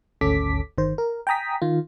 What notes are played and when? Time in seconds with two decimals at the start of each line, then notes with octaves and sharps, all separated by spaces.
0.21 G#1 D2 C#4 A4 D6 B6
0.78 G1 D#3 C5
0.98 A#4
1.27 G5 G#5 A#5 D#6 B6
1.62 D#3 F4